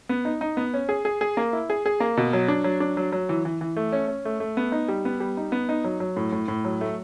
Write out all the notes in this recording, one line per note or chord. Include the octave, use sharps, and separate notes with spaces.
B3
D#4
D#4
B3
C#4
G#4
G#4
G#4
A#3
E4
G#4
G#4
A#3
B2
F#3
D4
F#3
D4
F#3
F#3
E3
E3
E3
A3
C#4
C#4
A3
A3
B3
D#4
G3
B3
G3
D#4
B3
D#4
F#3
F#3
A2
A2
A2
F#3
A3